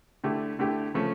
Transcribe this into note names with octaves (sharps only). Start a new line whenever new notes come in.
D3 A3 E4 G4
D3 A3 E4 G4
C#3 F3 A3 C#4